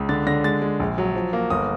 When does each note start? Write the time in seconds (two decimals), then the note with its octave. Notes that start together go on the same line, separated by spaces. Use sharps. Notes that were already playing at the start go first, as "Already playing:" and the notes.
Already playing: C#2
0.09 D3 A6
0.27 D3 A#6
0.44 G#3 A6
0.62 G#3
0.80 A#1
0.98 F#3
1.15 F3
1.33 A#3
1.50 G1 D#6